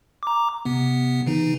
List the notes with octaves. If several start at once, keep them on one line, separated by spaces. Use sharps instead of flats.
A#5 D6
C3 B3
C#3 E3 D#4